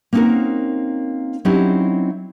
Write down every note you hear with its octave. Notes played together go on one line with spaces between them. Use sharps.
A#3 C4 C#4 D#4 F#4 A#4
F#3 C4 C#4 D#4 E4 G4